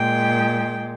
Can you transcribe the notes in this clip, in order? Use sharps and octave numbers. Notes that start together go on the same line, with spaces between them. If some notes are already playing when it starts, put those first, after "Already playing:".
Already playing: A#2 G#3 G5